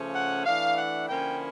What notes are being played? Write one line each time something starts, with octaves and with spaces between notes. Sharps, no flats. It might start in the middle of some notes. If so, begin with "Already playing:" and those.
Already playing: C#3 F3 A3 C#4
F#5
E3 A3 D4 F5
F#5
D3 F3 A#3 C#4 E4 G5